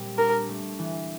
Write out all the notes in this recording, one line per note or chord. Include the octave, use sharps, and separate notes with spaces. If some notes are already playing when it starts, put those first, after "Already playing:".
Already playing: A#2 G3 C4
D4 A#4
A3
E3